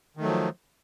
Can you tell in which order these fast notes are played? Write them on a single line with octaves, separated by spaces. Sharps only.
D#3 A3 F#3 F3